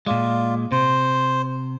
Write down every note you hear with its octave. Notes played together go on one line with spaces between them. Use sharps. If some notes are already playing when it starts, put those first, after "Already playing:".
A#2 G#3 F4 D5
C3 C5